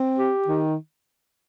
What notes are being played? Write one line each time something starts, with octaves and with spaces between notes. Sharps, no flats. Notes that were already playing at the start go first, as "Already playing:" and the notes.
Already playing: C4
G4
D#3